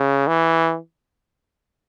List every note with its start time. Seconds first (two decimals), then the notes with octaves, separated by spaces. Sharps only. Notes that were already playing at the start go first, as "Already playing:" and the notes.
Already playing: C#3
0.27 E3